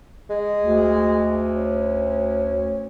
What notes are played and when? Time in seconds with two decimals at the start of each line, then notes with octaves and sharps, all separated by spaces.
0.30 G#3
0.60 D2
1.56 C#4